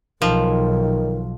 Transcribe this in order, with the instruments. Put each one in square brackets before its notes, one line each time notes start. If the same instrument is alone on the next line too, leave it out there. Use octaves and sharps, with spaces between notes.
[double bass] B1 [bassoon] D#3 [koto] F3